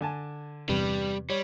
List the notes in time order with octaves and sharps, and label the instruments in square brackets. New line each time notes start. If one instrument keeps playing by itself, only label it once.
[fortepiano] D3 G#5 A5
[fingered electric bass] E2 C3 [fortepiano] G2 [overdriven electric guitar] G3
[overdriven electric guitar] G3 [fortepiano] C#5